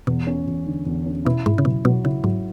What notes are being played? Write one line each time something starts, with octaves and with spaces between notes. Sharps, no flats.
E2 B2
C#4
E2
D3
E2
C#4
B2 E4
G#2 E4
C#3
B2 F#3
B2 F#3
C#3 E4
G#2 F#3